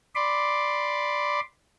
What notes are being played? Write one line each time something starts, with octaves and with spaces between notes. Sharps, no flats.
D5 B5 C6 D6